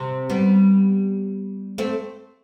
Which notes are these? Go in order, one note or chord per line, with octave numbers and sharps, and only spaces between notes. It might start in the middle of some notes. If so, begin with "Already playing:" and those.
Already playing: C3
G3 B3
A3 C4